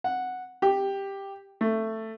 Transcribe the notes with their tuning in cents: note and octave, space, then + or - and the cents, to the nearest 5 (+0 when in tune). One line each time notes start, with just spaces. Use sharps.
F#5 -5
G4 +5
A3 +10